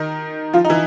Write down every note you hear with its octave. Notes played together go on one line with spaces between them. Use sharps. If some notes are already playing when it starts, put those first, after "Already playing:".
Already playing: D#3 D#4
F3 F4
D#4
E3 E4